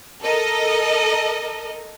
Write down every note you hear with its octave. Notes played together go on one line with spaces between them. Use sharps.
A4 A#4 D#5